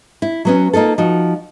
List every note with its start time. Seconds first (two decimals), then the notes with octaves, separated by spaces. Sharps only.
0.22 E4
0.45 F#3 B3 C#4
0.73 A#3 D#4 F4 A4
0.98 F3 D#4 F#4